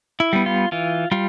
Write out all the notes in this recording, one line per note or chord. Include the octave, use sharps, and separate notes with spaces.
E4
G3 B3
F4
E3 F4
G3 F4